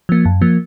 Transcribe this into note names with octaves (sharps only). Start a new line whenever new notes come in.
F3 A#3
F#2
F3 A#3